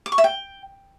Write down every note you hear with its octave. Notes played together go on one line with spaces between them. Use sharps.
D6
C#6
E5
G5